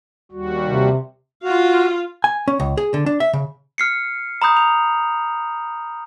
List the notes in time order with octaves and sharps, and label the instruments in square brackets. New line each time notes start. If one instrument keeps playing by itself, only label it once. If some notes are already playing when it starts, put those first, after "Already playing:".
[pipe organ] D#2 G3 F#4
[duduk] C3
[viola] F4 F5 [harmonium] F#4
[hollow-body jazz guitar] G#5
C#4
C#2
G#4
D3
D4
E5
C#3
[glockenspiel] F6 C7 C#7
A#5 B5 D#6 G6
F7